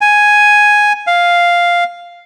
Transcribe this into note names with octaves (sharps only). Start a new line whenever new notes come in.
G#5
F5